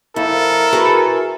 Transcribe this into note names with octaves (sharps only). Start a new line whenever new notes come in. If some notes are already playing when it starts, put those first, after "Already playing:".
F2 E4 A4 A#4
F#4 G#4 B4